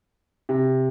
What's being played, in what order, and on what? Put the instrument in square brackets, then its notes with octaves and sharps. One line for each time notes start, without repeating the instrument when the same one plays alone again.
[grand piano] C3